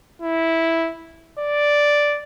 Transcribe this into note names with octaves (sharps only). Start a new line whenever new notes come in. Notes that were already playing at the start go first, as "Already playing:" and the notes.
E4
D5